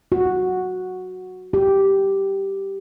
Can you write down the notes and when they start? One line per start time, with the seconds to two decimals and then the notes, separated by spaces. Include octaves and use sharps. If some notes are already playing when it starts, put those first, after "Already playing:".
0.12 F#4
1.53 G4